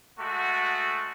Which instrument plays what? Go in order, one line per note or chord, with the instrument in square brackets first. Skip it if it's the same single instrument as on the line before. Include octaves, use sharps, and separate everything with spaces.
[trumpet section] G#3 A3 F#4